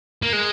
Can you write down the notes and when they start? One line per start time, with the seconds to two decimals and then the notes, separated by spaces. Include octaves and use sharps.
0.22 A#3
0.33 G#3